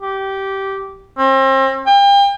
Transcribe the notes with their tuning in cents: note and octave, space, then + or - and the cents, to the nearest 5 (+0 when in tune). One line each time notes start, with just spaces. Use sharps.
G4 -15
C4 +35
G5 +35